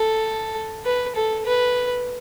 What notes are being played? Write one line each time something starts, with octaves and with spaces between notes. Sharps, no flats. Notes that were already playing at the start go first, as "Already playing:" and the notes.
Already playing: A4
B4
A4
B4